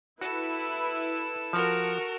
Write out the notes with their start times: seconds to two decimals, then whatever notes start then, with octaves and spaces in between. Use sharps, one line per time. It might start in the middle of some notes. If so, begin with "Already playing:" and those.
0.21 E4 F#4 A4 B4
1.53 F3 F#4 A#4